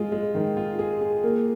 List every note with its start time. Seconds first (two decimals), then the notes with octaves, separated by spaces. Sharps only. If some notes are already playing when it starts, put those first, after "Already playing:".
Already playing: G#3 F4 G#4
0.12 G#3
0.35 D#3
0.57 F4
0.79 G#4
1.01 G#4
1.24 A#3